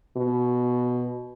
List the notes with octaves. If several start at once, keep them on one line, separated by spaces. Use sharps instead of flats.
B2